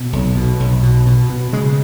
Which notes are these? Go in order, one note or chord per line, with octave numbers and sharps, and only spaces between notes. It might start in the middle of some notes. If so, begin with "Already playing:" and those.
Already playing: B2
B1
B2
B1
B2
B2
B2
C#3 G#3